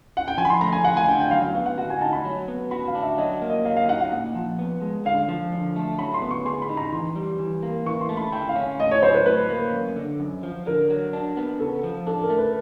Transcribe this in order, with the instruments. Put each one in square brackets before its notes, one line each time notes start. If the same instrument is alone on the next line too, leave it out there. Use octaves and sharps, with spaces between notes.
[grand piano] F#5
G5
[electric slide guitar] F3 [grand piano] G#5
[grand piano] B5
C6
[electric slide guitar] A3 [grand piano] A#5
[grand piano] G#5
[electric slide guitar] F4 [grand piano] F#5
[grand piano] G#5
[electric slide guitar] D4 [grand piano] G5
[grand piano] G5
[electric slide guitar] F#3 [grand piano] F5
[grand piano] F5
[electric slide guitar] B3
[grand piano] F#5
[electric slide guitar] F#4 [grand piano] F#5
[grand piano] G#5
[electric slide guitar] D#4 [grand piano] A5
[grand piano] B5
[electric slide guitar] F#3
B3
[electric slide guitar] F#4 [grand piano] B5
[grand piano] F5
[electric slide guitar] D4
[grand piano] E5
[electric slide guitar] F#3 [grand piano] D#5
[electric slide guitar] A#3
[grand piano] D#5
[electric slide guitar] F#3 [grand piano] F5
[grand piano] F5
[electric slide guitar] D#4 [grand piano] F#5
[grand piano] F#5
[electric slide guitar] A#2
F3
B3
G#3
[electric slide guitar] D3 [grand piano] F5
[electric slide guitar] F3
D3
A3
[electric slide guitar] F#3 [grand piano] B5
[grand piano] C6
[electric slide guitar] B3
[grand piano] C#6
[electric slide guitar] G#4 [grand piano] C6
[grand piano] B5
[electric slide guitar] D#4
[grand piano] A#5
[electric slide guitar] E3 [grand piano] C6
[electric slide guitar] G3
E3
A#3
[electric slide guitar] E3 [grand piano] C#6
[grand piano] C6
[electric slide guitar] A3
[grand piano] B5
[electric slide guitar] E4 [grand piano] G5
[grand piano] F5
[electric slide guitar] C#4
[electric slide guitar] A2 [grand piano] D#5
[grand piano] C#5
[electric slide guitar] F#3 [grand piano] C5
[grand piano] B4
[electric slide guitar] A2 [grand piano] B4
[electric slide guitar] A#3
F#2
D3
F#2
F3
[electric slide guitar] D3 [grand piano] A#4
[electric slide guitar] F#3
D4
B3
[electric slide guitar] C#3 [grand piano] A4
[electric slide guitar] F3
[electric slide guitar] D4 [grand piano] A4
[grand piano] A#4
[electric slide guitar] A3
[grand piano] B4